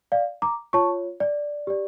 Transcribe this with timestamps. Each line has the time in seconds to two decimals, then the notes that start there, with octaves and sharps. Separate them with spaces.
0.12 D5 F5
0.42 A#5 D6
0.73 F4 C#5 A5 C#6
1.20 D5
1.67 G4 D5